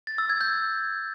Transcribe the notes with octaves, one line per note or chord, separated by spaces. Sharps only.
A6
E6
G#6
G6